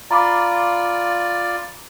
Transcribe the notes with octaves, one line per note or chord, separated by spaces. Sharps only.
F4 D5 A#5 B5 D6